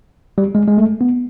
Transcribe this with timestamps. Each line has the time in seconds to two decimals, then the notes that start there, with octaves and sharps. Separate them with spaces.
0.38 G3
0.55 G#3
0.68 G#3
0.78 A3
1.01 B3